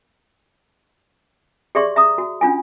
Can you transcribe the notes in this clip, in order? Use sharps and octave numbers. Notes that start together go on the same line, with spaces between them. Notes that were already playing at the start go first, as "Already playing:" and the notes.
G4 G#4 D5 E5 C6 C#6
E5 A#5 D#6
F#4
C#4 D4 F4 G#5